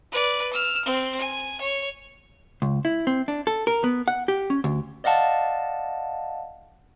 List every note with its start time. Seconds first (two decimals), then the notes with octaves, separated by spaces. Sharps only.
0.12 B4 D5
0.53 E6 F6
0.85 C4
1.19 G#5
1.61 C#5
2.62 C#2
2.85 E4
3.07 C4
3.28 D4
3.47 A4
3.67 A#4
3.84 B3
4.08 F#5
4.28 G4
4.50 C#4
4.64 D2
5.04 D5 D#5 F5 F#5 A5